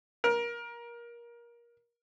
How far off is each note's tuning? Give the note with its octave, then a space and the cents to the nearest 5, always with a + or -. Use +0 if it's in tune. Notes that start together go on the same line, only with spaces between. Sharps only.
A#4 +20